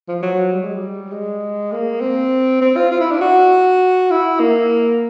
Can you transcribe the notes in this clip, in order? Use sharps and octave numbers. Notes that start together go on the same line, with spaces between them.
F3
F#3
G3
G#3
G3
G#3
A#3
C4
C4
F4
F4
E4
D4
F#4
E4
A#3